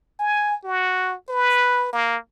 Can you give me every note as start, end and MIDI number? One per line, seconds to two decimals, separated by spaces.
0.20 0.57 80
0.64 1.15 66
1.29 1.91 71
1.93 2.17 58